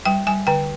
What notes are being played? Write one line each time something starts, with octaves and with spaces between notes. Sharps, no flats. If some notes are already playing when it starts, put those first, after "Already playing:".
G3 G5
G3 G#5
D3 G5